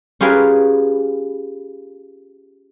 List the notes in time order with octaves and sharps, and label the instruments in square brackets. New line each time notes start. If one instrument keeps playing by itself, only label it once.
[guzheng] C#4 F4 G4 G#4 A#4 B4